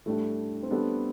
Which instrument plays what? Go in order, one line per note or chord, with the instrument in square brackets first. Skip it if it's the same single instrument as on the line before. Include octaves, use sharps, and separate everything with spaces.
[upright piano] A2 G3 D4 [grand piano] A3
[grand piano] C4
[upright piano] G3 D4 A4 [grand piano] B3